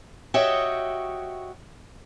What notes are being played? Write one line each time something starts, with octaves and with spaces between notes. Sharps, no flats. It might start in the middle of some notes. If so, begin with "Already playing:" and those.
F#4 G4 C#5 D#5 E5 G5